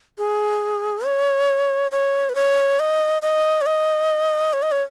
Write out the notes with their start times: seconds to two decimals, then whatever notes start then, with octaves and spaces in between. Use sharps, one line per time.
0.18 G#4
1.06 C#5
1.91 C#5
2.29 B4
2.35 C#5
2.79 D#5
3.22 D#5
3.61 C#5
3.66 D#5
4.53 C#5
4.62 D#5
4.72 C#5